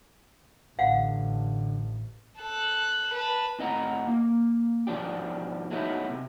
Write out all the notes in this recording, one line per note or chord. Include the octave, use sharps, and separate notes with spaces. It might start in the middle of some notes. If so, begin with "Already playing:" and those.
A1 D3 F5 F#5
A4 F#6
B4 A5
A2 C4 D#5 F#5 A#5
A#3
G#2 B2 F3 D4 G4
F#3 G#3 A3 B3 D#4 E4
C3